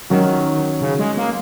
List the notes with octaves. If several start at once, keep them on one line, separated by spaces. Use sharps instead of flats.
D#3 F#3 C#4 F#4
C#3
G#3
A#3